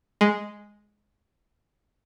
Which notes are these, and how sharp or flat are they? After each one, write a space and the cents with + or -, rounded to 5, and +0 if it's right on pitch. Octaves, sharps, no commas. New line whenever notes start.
G#3 +0